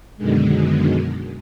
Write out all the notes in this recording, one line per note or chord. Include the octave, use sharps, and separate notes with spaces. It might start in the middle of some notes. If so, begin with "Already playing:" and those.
F#2 B2 D3 D#3 G#3